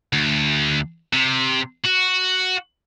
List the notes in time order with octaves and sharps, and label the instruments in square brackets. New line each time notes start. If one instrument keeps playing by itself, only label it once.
[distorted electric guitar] D2
C3
F#4